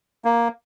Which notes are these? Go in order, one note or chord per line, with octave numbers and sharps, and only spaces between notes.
A#3